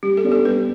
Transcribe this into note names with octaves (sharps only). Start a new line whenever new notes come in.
G3 G4
A4
B3 D4 G4
A4
G3 B4